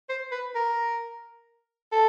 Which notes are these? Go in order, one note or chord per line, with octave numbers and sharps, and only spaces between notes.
C5
B4
A#4
A4